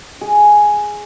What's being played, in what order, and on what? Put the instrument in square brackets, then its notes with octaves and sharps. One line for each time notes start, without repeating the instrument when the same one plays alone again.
[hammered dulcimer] G#4